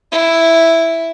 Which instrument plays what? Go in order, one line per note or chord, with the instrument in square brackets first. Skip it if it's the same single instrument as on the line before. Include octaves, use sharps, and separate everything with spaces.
[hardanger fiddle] E4